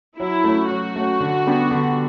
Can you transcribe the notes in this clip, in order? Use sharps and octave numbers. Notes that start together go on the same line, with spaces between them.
F#3 E4
A3 C#4
F#3 F#4
A3 C#4
D3
G3 B3 D4 G4
D3